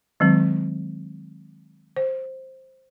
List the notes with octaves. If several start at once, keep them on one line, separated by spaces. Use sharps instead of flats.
D#3 F#3 G#3 C4
C5